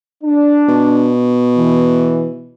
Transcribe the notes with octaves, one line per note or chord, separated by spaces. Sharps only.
D4
B2
E3